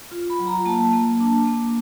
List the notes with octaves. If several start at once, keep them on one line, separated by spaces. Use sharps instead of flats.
F4
B5
F#3
A#5
A#3 A5
A#3
D4
A#3